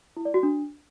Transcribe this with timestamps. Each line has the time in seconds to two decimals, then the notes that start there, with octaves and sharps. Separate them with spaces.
0.17 E4
0.25 D5
0.34 F#4
0.43 D4